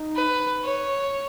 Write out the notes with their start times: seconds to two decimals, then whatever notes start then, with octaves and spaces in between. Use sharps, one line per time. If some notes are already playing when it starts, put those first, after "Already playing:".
Already playing: D#4
0.16 B4
0.63 C#5